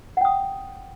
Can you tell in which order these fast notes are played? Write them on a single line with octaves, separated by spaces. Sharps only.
F#5 G5 D#6